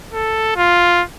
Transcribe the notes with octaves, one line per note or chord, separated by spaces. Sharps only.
A4
F4